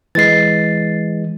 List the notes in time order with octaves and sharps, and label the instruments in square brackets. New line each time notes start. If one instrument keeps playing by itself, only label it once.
[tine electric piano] E3 G#3 [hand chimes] A6 C7